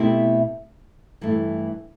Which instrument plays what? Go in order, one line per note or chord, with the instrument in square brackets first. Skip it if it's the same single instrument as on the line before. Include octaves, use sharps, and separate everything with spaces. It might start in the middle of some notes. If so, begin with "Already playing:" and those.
Already playing: [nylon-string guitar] B2 A3 C4 E4 G4
G2 E3 A3